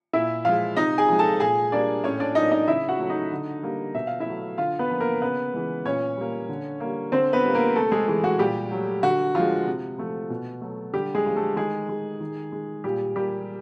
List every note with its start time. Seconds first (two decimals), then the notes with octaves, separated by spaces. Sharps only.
0.13 A#2 E4 E5
0.45 F3 G#3 F4 F5
0.76 C3 D#4 D#5
0.98 G#4 G#5
1.08 F3 G#3
1.19 A4 A5
1.40 A#2 G#4 G#5
1.72 G3 A#3 D4 D5
2.04 A2 C#4 C#5
2.20 D4 D5
2.35 F#3 A#3 D#4 D#5
2.51 D#4 D#5
2.68 C#3 E4 E5
2.89 F#4 F#5
2.99 F#3 A3
3.09 D#4 D#5
3.31 D3
3.63 G3 A#3
3.94 B2 E5
4.07 F5
4.20 E4 E5
4.26 F#3 A3
4.58 D3 F4 F5
4.79 B3 B4
4.90 F3 A#3
5.00 A#3 A#4
5.21 C#3 B3 B4
5.54 E3 G#3
5.85 A#2 C#4 C#5
6.17 G3 A#3
6.49 D3
6.80 G3 A#3
7.12 D3 C4 C5
7.33 B3 B4
7.44 G3 A#3
7.55 A#3 A#4
7.76 C3 A3 A4
7.91 G#3 G#4
8.08 E3 G#3
8.24 F#4
8.39 A#2 G3 G4
8.71 F#3 A3
9.03 D3 F#4
9.35 F3 G#3 F4
9.67 C3
9.98 F3 A3
10.30 B2
10.61 F#3 A3
10.93 D3 G3 G4
11.15 G#3 G#4
11.26 F3 A3
11.36 A3 A4
11.57 D#3 G#3 G#4
11.89 G#3
12.20 D#3
12.52 G#3
12.84 A#2 G3 G4
13.16 G3 A#3 G4